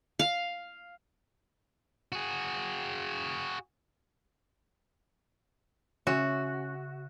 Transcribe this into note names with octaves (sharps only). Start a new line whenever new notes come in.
F5
F#4 G#4
C#3 C#4 F#4 E5